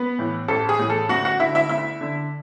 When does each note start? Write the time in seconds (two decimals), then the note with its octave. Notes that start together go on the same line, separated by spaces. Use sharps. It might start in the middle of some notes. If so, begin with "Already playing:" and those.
Already playing: B3 B4
0.19 A2 E3
0.48 A1 A4
0.69 G#4
0.79 A2 E3
0.90 A4
1.09 D2 F#4 F#5
1.25 F#4 F#5
1.39 D3 E4 E5
1.55 E4 E5
1.69 D2 E4 E5
2.01 D3